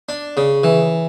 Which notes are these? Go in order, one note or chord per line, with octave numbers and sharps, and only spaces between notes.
D4
C#3
E3